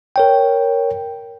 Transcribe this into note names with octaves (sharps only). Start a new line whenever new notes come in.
A#4 C#5 G5